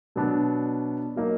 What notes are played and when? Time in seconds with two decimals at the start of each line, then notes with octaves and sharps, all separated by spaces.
0.16 B2 F#3 B3 D4
1.16 F#3 A#3 D#4